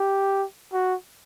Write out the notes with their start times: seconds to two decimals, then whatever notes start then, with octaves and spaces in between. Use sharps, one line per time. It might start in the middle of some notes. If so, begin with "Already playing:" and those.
Already playing: G4
0.73 F#4